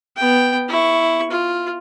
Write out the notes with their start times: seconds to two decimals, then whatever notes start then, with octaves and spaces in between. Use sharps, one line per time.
0.17 B3 G5
0.69 E4 C#6
1.30 F4